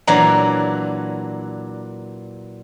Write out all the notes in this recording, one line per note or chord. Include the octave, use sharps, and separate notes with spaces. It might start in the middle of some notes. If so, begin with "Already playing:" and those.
A#2 E3 F#3 D4 A#5